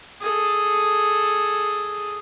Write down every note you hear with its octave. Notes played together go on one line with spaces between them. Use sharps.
G#4 A4